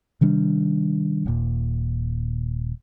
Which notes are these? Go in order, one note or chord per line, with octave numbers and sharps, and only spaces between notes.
C3 D#3 G3 D4
D#1 A#2